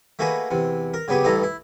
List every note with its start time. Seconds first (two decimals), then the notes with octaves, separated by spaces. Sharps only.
0.19 A3 A#3 F#4 G#4 B4
0.51 E2 C3
0.94 A#4
1.08 C#3 F#3 B3 G4 G#4
1.24 A1 G2 E3 E4 A4 A#5
1.43 E4